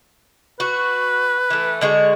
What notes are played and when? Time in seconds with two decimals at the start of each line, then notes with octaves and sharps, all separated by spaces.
0.60 F#4 B4
1.50 E3 A3
1.81 D3 G#3 F#4